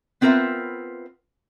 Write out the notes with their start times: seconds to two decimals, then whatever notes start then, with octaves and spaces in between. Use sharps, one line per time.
0.21 B3 C4 F4 A#4 B4 E5